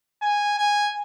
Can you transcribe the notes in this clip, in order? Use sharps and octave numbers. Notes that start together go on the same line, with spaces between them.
G#5
G#5